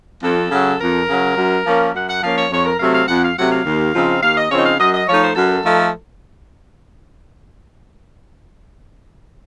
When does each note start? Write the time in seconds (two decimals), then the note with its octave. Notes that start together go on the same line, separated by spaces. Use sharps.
0.23 F2 A4
0.51 C#3 F#3
0.81 F2 A#4
1.09 C#3 F#3
1.37 F#2
1.66 F3 A#3 C#4
1.94 F#2 F#5
2.09 F#5
2.22 F3 A#3 C#4 F5
2.37 C#5
2.51 F2 C#5
2.65 A#4
2.79 C3 F#3 A3 C4 F5
2.95 F5
3.08 F2 F#5
3.23 F5
3.37 C3 F#3 A3 C4 F#5
3.51 F5
3.65 D#2
3.94 C#3 F3 C4 D#4
4.22 D#2 F5
4.37 D#5
4.51 C#3 F3 C4 D#4 C#5
4.65 F5
4.79 F#2 D#5
4.94 D#5
5.08 F3 A3 D#4 C#5
5.23 C5
5.36 F#2 A4
5.65 F3 A3 D#4